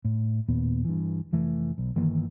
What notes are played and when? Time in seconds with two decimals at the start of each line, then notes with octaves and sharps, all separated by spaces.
0.05 A2
0.48 D#2 A#2 B3
0.85 G2 E3
1.32 F1 E3 A3
1.78 B1
1.96 G1 D#3 E3 A#3